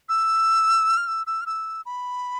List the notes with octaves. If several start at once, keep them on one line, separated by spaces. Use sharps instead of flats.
E6
F6
E6
E6
F6
E6
B5